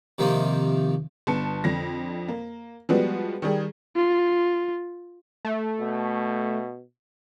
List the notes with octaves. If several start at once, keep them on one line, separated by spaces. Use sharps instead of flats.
C3 D#3 F3 A#3
G1 B3 A5 C#7
F2 D3 A#6
A#3
F3 G3 G#3 B3 F#4 B4
D#3 G3 G#4
F4
A3
B2